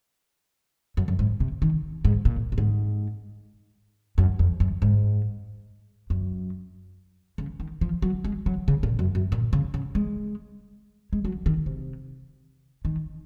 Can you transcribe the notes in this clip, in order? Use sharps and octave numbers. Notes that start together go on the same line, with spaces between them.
F#2
F#2
G#2
C3
D#3
G#2
A#2
A#2
G#2
F#2
F2
F#2
G#2
F#2
C#3
D#3
F3
F#3
G#3
F#3
C#3
A#2
F#2
F#2
A#2
C#3
C#3
G#3
G#3
F#3
D#3
C3
D#3